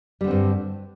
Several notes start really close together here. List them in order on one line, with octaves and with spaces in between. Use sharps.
G3 D3 C4 G2